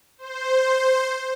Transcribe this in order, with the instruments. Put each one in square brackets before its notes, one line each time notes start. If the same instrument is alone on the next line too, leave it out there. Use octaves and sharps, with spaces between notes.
[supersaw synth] C5